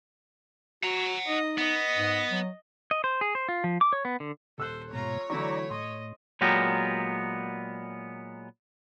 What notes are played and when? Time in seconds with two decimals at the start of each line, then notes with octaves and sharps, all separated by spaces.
0.83 F#4 F#5 A#5
1.27 D#4 D#5
1.58 B3 D#5
1.94 G#2
2.30 F#3
2.91 D#5
3.04 C5
3.21 G#4
3.35 C5
3.49 F4
3.64 F3
3.81 D6
3.93 C#5
4.05 B3
4.20 D3
4.58 D#1 A4 C5 E6 F#6
4.93 G#2 B2 F4 C#5 A#5
5.30 D3 E3 F#3 A3 E4 D5 A#5 C#6
5.70 A2 D#5 C6
6.41 A#2 F#3 G#3 B3 G4 A#4